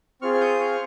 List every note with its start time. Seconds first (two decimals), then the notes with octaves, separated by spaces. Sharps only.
0.22 C4 F4 G#4 C#6 F6
0.34 F6
0.41 D#6 G6
0.60 C#6 F6